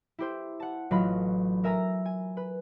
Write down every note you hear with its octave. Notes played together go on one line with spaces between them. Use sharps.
E4 G4 C5
F#5 A5
A1 F#3 F4 D#5 F5 B5
A#4 E5 G#5 A#5 E6
G#5
B4